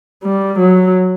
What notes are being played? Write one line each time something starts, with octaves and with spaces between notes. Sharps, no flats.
G3
F#3